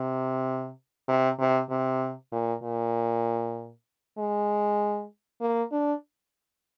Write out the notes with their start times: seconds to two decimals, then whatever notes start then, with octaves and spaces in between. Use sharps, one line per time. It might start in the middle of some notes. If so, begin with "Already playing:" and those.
Already playing: C3
1.08 C3
1.39 C3
1.70 C3
2.32 A#2
2.63 A#2
4.18 G#3
5.41 A#3
5.72 D4